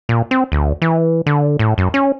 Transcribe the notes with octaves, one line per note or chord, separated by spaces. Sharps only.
A#2
C4
D2
E3
D3
A2
F#2
C#4